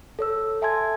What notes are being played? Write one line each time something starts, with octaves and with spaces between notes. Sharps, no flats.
A4 C#5 E6
A4 E5 G#5 A5 C6 G#6